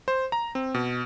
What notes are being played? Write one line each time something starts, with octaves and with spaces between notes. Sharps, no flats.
C5
A#5
C4
B2